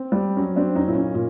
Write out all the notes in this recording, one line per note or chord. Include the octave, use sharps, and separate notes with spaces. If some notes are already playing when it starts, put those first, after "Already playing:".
Already playing: C4
G3
F#3 C#4
C4 D4
F#3
C#4 D#4
A#2 E4
C#4 D#4
A#2